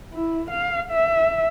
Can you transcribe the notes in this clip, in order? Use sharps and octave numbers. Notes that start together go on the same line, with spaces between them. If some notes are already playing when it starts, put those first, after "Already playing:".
E4
F5
E5